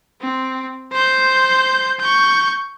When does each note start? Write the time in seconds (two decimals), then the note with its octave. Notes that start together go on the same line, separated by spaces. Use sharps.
0.21 C4
0.92 C5 G6
2.00 C#6 G6